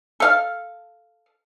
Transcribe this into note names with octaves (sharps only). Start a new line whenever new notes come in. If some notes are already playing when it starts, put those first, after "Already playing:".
A4 F5